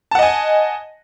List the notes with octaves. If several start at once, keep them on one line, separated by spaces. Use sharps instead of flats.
D#5 F#5 G#5 A5